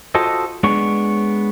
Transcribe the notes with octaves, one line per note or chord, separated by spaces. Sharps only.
F4 F#4 A4 C5 D#5
G#3 B3 D4 C#5